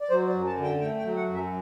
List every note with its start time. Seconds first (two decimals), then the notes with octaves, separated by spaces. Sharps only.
0.01 D5
0.10 F#3 C5
0.28 D5
0.34 F#2
0.46 A5
0.57 D3
0.63 G5
0.81 A3 G5
0.98 G5
1.05 F#3
1.16 F#5
1.28 F#2
1.34 E5